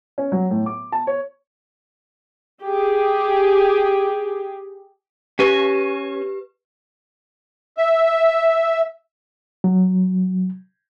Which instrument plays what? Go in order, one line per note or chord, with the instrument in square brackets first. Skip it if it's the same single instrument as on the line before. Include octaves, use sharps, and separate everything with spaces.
[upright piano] C#4
F#3
A2
D6
A5
C#5
[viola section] G4 G#4
[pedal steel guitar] C#4 G#5 C#6 [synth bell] G4 B4
[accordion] E5
[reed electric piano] F#3